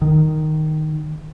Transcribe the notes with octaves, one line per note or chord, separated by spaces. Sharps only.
D#3